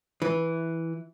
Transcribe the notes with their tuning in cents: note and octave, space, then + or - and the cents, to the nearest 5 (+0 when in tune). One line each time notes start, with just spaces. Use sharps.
E3 -5